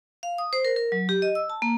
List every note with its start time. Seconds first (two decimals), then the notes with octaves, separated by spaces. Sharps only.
0.23 F5
0.38 D#6
0.53 C5
0.65 A#4
0.76 A#4
0.92 F#3
1.09 G4
1.22 D#5
1.35 E6
1.50 A5
1.62 A#3